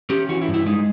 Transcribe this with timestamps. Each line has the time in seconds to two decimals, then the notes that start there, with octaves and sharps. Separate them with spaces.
0.10 C#4 G4
0.29 E3 F#4
0.41 E4
0.48 G2
0.54 E4
0.66 G#3 D#4